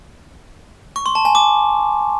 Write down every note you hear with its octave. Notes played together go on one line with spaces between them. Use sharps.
C#6
C6
A5
G#5
D6